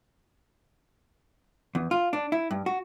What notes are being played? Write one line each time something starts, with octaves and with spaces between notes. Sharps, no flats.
E2
F4
D4
E4
G2
F#4